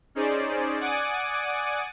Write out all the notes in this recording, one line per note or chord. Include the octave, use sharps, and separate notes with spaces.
C#4 D#4 G#4 C5 D5
D5 F#5 G#5 D6 D#6